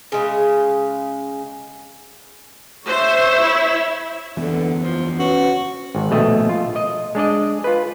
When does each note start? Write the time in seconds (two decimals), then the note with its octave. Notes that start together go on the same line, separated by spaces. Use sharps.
0.12 C#3 G#3
2.87 C5 C#5 E5
3.40 E4
4.37 F#1 E2 D3 E3 B3
4.78 F3
5.19 C#4 F#4 B4
5.95 G#1
6.10 A#1 B2 A3 D#5
6.49 F4
6.76 D#5
7.15 G#3 D4 D5 D#5
7.64 F4 B4